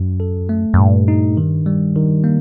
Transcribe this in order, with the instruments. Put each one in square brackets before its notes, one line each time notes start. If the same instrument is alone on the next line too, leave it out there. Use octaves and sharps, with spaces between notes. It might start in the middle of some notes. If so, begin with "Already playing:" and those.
Already playing: [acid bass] F#2
[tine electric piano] A4
A3
[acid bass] F#2
[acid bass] G2 [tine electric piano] A#2
[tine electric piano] D#4
D#3
G3
D#3
A#3